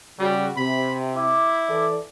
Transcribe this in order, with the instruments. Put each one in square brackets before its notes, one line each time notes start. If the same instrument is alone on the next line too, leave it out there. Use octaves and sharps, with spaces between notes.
[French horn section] C#3 F#4 [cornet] G3
[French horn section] C3 [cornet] B5
[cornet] E4 [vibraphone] D6
[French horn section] E3 A4 D5